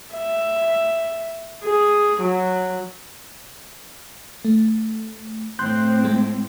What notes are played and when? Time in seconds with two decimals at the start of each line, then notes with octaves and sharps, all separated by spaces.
0.14 E5
1.64 G#4
2.21 F#3
4.45 A3
5.59 A2 C4 C6 F#6 G6
6.05 G#3